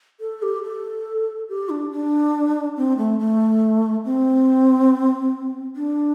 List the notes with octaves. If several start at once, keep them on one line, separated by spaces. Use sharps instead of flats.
A4
G4
A4
G4
D4
D4
C4
A3
A3
C4
D4